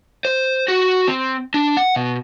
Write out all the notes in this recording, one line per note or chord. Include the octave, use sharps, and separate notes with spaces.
C5
F#4
C4
D4
F#5
B2